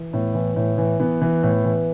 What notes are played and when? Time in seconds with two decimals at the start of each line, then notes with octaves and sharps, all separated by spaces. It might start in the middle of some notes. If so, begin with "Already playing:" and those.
Already playing: E3
0.13 A2 B3
0.35 E3
0.56 A2
0.78 E3
1.00 E3 B3
1.22 E3
1.43 A2
1.65 E3